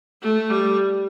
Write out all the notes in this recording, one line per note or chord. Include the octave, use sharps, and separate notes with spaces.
A3
G3